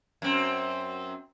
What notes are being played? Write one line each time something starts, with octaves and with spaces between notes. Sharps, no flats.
F#2 C4